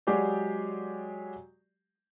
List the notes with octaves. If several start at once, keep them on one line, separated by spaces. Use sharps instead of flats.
F#3 G#3 G4 G#4 D5